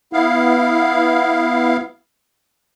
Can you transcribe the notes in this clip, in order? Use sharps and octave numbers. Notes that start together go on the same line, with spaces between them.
B3 E4 F5